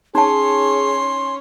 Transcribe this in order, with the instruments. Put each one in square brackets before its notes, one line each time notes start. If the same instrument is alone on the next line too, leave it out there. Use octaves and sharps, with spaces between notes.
[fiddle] C#4 C#5 [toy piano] D#4 A5 [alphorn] G#4 [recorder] C6